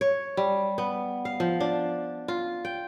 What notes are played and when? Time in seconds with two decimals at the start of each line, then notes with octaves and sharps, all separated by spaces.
0.01 C#5
0.37 G3
0.78 B3
1.25 F5
1.40 F3
1.60 D4
2.28 F4
2.65 G5